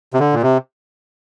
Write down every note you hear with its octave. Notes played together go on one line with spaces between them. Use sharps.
C3
D3
A#2
C3